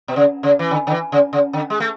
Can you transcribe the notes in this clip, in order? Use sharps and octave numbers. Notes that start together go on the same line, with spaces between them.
B2
C#3
C#3
E3
D3
D3
E3
C#3
C#3
D3
G#3
A3